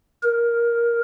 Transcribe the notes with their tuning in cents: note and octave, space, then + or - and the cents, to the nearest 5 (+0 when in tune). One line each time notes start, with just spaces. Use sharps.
A#4 +10